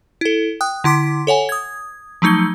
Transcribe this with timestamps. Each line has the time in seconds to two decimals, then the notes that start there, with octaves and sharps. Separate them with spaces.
0.21 E4 A4
0.61 G5 D#6 F#6
0.84 D3 E4 C6 D6 B6
1.27 A4 C#5 F#5 G#5
1.49 D#6 G#6
2.22 F3 F#3 A3 D#4 G#6 G7